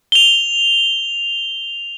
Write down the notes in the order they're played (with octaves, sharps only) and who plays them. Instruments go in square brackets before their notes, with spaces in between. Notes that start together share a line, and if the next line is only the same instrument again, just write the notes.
[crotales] F7 G7